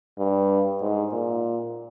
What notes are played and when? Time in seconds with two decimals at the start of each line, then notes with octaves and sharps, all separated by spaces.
0.18 G2
0.81 G#2
1.12 A#2